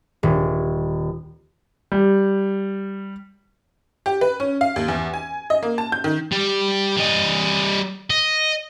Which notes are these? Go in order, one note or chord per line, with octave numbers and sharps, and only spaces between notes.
D#1
G3
G4
B4
C#4
F5
D#2
E2
G#5
D#5
A#3
A5
G6
D#3
G3
G3 D#5
D#5